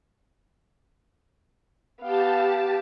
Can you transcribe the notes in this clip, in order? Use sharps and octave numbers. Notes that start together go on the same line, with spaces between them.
B3 G4 F5 A5